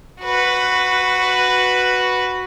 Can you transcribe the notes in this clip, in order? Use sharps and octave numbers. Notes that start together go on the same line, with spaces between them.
F#4 B4